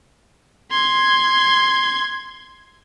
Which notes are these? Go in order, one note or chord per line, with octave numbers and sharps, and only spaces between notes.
C6 G#6